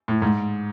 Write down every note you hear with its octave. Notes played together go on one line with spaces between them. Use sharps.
A2
G#2